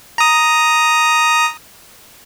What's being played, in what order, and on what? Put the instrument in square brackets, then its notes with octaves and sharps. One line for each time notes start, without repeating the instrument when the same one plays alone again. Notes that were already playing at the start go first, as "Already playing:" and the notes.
[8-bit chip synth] A#5 D#6